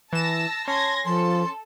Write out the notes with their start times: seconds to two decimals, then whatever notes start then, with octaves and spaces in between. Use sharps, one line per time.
0.13 E3 A5 E6 A#6 E7
0.68 C#4 A5 C6 G#6 A#6
1.05 F3 A4 C6